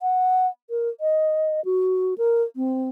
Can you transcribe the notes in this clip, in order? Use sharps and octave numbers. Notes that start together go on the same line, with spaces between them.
F#5
A#4
D#5
F#4
A#4
C4